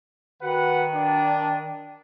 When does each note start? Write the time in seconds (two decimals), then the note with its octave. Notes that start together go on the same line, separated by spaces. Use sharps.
0.42 D#3 F#4 B4 F#5
0.94 D4